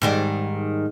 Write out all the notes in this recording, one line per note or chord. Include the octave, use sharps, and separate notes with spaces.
G#2 D#3 G3